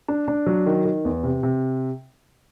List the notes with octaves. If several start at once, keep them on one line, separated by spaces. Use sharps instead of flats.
D4
D4
F#3
D#3
D#3
E2
C3
C3